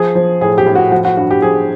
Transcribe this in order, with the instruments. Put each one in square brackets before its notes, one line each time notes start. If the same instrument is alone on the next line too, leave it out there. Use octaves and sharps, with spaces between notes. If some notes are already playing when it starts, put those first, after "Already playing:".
Already playing: [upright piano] F3 G#4
F3
A2 G#4
G4
A2
F#4
F3 F#4
F#4
G2 F#4
G4
F3 G#4